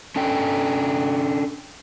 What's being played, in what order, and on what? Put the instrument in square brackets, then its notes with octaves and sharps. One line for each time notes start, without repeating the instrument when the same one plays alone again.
[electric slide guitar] C#4 D4 A4 G5